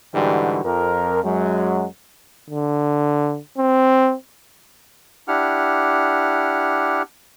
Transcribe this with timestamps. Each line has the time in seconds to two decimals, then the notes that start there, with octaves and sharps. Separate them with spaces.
0.14 G#2 D3 E3 G3 F#4 G4
0.65 F2 A#4
1.24 F#2 F#3 G#3
2.50 D3
3.58 C4
5.28 D4 E4 G4 F#5 F6